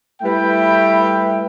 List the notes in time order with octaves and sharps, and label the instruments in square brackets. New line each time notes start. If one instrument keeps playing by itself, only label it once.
[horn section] G3 A3 E4 B4 E5 G5